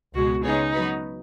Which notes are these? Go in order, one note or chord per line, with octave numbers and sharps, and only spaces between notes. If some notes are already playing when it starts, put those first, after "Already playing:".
C#2 B2 G#3 F#4
C#3 G#3 B3 D#4 G#4 C#5
F#3 B3 F#4 B4